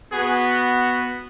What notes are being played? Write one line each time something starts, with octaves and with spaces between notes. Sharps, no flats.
B3 F#4 G#4